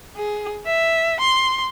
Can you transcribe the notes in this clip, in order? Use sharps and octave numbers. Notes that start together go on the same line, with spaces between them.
G#4
E5
C6